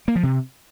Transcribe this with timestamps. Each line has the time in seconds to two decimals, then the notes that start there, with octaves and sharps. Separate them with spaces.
0.08 A#3
0.16 F3
0.23 C3